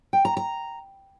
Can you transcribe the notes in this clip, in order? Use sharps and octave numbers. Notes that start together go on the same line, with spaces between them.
G5
A#5
A#5